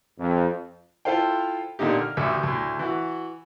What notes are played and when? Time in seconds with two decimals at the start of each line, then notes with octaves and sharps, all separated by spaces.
0.19 F2
1.05 E4 F4 A4 C5 F5 G5
1.79 A#2 D3 A#3 D#4 G4
2.02 F6
2.17 A1 D2 E5
2.43 D2 A2
2.79 E3 F#4